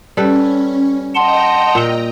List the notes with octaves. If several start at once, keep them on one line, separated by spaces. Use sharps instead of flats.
G3 C#4 A4 B4
D#5 F#5 G5 A5 A#5 C6
A#2